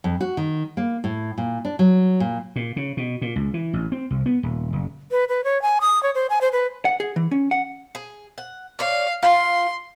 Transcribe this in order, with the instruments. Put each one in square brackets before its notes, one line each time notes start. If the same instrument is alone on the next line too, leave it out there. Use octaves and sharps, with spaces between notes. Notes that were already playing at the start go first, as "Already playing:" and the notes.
[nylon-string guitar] F2
F#4
D#3
A#3
A2
A#2
D4
F#3
A#2
[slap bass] A#2
C#3
B2
A#2
C#2
E3
A1
C4
C2
B3
D#1
F#1
[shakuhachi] B4
B4
C#5
G#5
D#6
C#5
C5
G#5
C5
B4
[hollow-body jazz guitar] F#5
G#4
E3
C#4
F#5
[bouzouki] G#4
F#5
[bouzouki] C#5 D5 [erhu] F5
[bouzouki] F4 [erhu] C6